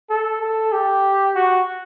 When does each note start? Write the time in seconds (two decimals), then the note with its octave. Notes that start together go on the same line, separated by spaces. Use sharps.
0.10 A4
0.42 A4
0.72 G4
1.35 F#4